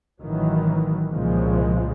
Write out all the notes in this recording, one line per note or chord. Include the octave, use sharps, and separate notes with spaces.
A1 D#3 E3 F#3
C2 A#2 C#3 F3 G#3